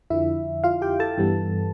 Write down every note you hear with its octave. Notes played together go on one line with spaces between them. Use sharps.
F2 D3 F3 E4 E5
F4 F5
G4 G5
A4 A5
G2 E3 G3 B3